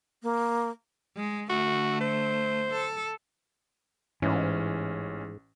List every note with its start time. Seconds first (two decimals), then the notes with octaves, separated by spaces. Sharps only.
0.23 A#3
1.17 G#3
1.50 D3 A3 F#4
2.01 C5
2.72 A4
4.22 A1 G#2 E3 C#4